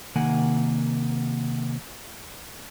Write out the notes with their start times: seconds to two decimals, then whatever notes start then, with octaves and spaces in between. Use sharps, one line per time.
0.15 C3 D#3 A#3 F#5 G#5